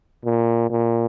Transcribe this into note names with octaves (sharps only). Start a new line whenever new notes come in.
A#2
A#2